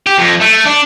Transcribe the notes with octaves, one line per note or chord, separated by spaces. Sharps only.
G4
F2
A3
D4